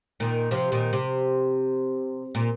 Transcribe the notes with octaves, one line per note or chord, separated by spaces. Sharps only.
A#2 D#3
C3 F3
A#2 D#3
C3
A#2